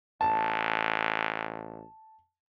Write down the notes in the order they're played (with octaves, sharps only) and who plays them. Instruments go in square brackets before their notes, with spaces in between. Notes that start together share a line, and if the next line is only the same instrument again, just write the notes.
[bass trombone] A1 [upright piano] A5